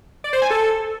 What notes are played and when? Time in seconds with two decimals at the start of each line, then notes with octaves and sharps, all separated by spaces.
0.24 D5
0.33 C5
0.42 G#5
0.50 A4